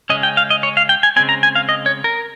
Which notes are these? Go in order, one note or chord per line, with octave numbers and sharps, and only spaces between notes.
C#3 G#3 C#4 D#5
G5
F5
D#5
C#5
F5
G5
G#5
C#3 F3 G#3 C4 G#5
A#5
G#5
F5
D#5
C#5
A#4